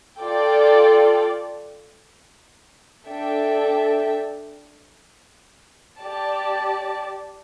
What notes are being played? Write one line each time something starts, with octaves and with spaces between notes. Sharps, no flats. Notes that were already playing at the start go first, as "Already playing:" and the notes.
F4 A4 D5 G5
D4 A4 E5 G5
G4 D5 A5